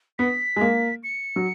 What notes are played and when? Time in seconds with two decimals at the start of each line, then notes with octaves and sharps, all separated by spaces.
0.19 B3 B6
0.56 G#3
0.61 A#3
1.04 C#7
1.36 F#3